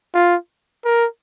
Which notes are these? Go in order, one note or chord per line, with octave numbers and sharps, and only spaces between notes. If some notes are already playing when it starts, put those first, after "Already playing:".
F4
A#4